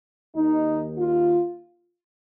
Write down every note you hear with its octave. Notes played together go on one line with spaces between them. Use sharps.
D#2 D#3 D#4
F4